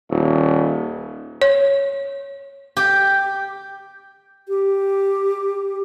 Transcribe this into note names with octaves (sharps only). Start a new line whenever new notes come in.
D#1
C#5
G4
G4